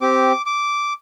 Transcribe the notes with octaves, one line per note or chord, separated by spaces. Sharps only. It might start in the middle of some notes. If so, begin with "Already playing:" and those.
C4 G4 D6
D6